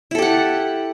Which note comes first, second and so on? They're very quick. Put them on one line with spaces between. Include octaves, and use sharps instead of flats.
E4 A4 G4 F#5